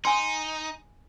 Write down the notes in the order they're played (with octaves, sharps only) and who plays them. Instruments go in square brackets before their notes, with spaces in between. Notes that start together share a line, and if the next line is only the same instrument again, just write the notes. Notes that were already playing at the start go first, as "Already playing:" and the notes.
[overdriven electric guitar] D#4 [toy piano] G#5 C6